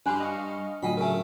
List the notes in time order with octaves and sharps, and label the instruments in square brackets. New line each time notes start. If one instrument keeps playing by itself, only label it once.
[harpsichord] G2 G3 [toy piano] D4 G#5 B5 [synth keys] G4 C6 F#6
[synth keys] D#5 F5 C#6
[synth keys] A2 D3 F#3 [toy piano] F4 G5 G#5 [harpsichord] D#5 B5
[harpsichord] C#3 A3 [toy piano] A#4 G#5